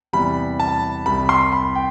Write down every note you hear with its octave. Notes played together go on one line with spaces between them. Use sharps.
E2 C3 E3 G3 B3 B5
A5
C2 C3 G3 B5
C6
B5
G5